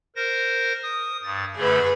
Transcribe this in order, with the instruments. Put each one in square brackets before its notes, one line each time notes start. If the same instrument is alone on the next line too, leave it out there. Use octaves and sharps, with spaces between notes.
[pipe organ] A#4 C5 A#6
D#6
G2 A6
[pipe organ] F#2 D3 A3 [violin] G#4 B4